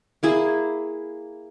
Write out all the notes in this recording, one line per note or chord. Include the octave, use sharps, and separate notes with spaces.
A#3 E4 G#4